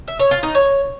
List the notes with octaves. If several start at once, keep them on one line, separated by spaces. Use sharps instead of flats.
E5
C#5
F4
D#4
C#5